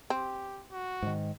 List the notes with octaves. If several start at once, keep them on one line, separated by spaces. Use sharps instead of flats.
C4 G4
F#4
G#2 D#3